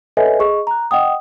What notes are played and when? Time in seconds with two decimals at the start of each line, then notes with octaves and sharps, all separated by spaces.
0.17 A4 B4 C#5 D#5 E5 G#5
0.40 G#4 D#5 C#6
0.67 A#5 F#6
0.91 D#5 F#5 G5 D#6